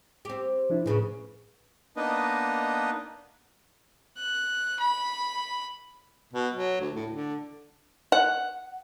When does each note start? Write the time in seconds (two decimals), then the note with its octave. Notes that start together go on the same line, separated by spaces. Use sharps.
0.25 C4 G4
0.70 F3 D4 E4
0.86 D#2 A2 C#3 G#4 B4
1.97 A#3 B3 D4 D#4 B4 D#5
4.18 F#6
4.80 B5
6.33 B2
6.54 F#3
6.81 D2
6.95 A2
7.12 D3
8.12 F#5